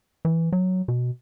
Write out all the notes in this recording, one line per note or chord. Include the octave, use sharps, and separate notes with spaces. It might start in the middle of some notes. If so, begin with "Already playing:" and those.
E3
F#3
B2